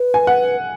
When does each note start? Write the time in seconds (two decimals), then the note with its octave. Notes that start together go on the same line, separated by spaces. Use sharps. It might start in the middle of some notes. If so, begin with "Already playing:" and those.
Already playing: B4
0.14 G#5
0.27 F#5